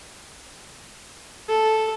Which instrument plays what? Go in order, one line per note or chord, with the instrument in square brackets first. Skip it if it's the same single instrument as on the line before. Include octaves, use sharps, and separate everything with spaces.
[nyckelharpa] A4